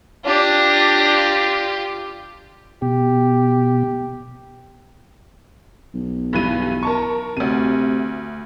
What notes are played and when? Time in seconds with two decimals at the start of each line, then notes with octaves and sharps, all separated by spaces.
0.25 D4 F4 G4 A#6
2.82 B2 G4
5.94 B1
6.33 G2 E3 D#7
6.83 A#4 A5 C#6
7.37 D2 C3 D#7